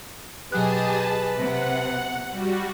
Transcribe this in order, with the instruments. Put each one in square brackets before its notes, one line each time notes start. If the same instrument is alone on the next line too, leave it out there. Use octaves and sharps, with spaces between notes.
[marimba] B2 F#3 F#6 [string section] G4 G#4 D#5 [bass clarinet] B4 [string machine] A5
[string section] C3 [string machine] F#5 [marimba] A#6
[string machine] G3 F#4